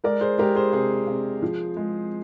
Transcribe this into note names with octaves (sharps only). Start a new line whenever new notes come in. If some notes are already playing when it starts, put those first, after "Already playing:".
G#3 A#4 D5
G#4 C5
G#3 G4 A#4
G#4 C5
C3 G#4 C5
C3
F3
G#3